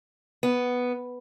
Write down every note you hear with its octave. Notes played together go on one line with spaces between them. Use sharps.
B3